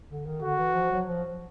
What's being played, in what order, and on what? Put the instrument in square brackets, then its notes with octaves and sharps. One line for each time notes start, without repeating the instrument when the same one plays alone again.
[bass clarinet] D3
D#3
[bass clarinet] D3 [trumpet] F#4
[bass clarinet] E3
F3
F#3
F3